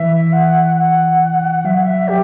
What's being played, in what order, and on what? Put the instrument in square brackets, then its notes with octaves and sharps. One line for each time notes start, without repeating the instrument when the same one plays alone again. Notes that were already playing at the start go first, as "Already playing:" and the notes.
Already playing: [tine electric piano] E3 [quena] E5
[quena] F#5
F#5
[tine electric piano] F#3 [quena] E5
[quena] F#5
E5
[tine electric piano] F#3 [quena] G4